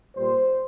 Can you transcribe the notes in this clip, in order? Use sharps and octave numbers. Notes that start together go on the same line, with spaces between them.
A#2 G3 C5